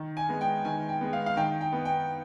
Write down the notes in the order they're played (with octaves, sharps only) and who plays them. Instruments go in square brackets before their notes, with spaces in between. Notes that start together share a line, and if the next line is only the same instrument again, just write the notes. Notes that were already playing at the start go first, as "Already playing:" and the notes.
Already playing: [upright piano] D#3
G#5
G#3 B3
G5
D#3 G#5
G5
G#3 B3
F5
F5
D#3 G5
G5
B3
G5